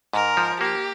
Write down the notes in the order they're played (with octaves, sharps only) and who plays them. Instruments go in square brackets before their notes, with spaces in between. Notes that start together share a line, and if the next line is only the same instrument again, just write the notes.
[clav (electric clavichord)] G#2 [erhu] A#4
[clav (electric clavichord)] F3
[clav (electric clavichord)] A#3 [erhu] G4